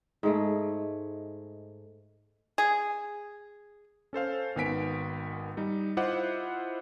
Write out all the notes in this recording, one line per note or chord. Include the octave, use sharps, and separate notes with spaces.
G#2 G#3 A3
G#4
C#4 A4 C5 F5
G#1 D#3 B3 G#5 B6 D7
G3 D#4
E4 F4 C5 D#5 F#5 D6